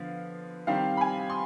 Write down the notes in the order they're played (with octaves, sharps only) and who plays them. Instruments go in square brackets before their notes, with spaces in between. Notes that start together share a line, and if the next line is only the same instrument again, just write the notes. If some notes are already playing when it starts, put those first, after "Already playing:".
Already playing: [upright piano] D3 F3 B3 F5
D#3 G3 C4 F5
B5
G#5
C6